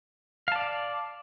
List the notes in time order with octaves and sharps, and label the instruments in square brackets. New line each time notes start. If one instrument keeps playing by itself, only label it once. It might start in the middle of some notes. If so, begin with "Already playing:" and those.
[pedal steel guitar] F5
A5
D5